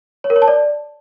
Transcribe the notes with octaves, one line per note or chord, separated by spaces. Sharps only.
C#5
A#4
C#5
A5
D5